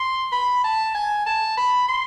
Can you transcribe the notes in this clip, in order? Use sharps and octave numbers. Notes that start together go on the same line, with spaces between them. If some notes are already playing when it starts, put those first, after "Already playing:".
Already playing: C6
B5
A5
G#5
A5
B5
C6